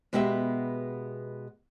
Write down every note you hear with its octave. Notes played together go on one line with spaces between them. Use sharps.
B2 G#3 B3 G4 B4 E5